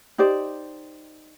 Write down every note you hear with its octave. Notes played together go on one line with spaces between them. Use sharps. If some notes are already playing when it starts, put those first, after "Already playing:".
D#4 G4 C5 D5